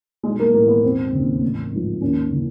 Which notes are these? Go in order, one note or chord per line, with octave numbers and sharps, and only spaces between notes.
B1 G#3
A#3
A2 E3 A#3
B3
E1 C4
D#2 C#3
A1
G#2 F3
D#2 C#4
C#3 E3